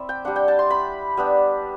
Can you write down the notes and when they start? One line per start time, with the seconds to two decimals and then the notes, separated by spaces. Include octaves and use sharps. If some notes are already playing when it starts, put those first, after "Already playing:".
Already playing: C4 E4 D5 E5
0.09 G5
0.25 G3 D4 F#5
0.36 G5
0.48 A5
0.59 C6
0.70 B5
1.17 G3 B3 D4